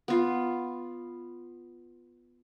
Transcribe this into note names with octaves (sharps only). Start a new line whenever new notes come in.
B3 F4